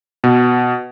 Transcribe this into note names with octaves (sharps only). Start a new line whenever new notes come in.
B2